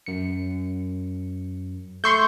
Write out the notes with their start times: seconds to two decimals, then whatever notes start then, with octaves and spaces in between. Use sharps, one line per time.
0.06 F#2 C#7
2.04 A3 C6 C#6 E6 G6